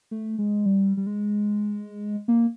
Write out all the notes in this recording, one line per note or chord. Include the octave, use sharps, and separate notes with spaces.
A3
G#3
G3
G3
G#3
A#3